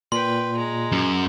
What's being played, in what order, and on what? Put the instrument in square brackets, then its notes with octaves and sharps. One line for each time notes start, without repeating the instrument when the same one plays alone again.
[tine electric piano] A#2 [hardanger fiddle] B4 G5 [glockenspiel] C6
[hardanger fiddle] G#3 A#5
[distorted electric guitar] F#2